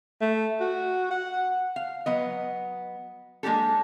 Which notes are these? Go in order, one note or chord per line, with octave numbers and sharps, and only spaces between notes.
A3
F#4
F#5
F5
F#3 B3 D#5
G#3 A#3 D4 G4 A4